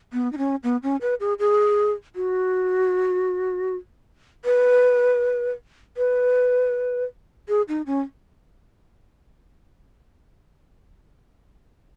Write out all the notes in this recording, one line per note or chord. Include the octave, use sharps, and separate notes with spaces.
B3
D#4
C#4
B3
C#4
B4
G#4
G#4
F#4
B4
B4
G#4
D#4
C#4